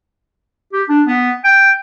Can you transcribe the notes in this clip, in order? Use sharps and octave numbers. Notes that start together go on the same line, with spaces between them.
G4
D4
B3
G5